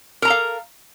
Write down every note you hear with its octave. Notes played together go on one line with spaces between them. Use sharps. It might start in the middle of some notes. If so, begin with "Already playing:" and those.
A4 A#4 F5 A#5